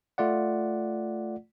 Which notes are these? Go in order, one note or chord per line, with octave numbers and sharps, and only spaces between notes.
A3 F4 D5 F#5